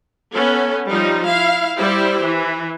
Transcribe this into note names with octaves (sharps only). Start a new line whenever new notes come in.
B3 C#4 A4
F3 G3 D#4
E4 F5
G3 E4 G4 C5
E3